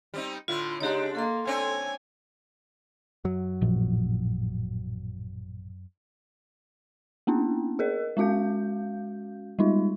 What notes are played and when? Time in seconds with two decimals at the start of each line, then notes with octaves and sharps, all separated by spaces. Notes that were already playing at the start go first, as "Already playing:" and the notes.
0.14 G3 C4 D#4
0.48 A2 D3 E4 F4 C6
0.81 C#3 G#3 D4 D#4 G4 C#5
1.15 A#3 A4 C6
1.47 C4 D4 C#5 G#5
3.25 F#2 F#3
3.61 A1 A#2 F3
7.27 A#3 B3 C#4 D4 E4
7.79 G#4 A#4 D#5
8.17 G#3 C#4 F#4 F5 G6
9.59 G3 G#3 D#4 F4